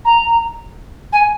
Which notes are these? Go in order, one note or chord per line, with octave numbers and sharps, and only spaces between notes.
A#5
G#5